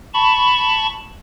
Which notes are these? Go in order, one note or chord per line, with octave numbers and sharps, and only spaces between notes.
A5 B5 C#6